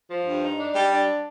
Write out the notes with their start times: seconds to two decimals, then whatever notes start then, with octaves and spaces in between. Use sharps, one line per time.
0.09 F3
0.25 G2
0.42 D#4
0.58 D4
0.75 G3
0.91 D4